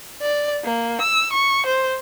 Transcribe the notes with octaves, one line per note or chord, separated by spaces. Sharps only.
D5
A#3
E6
C#6
C5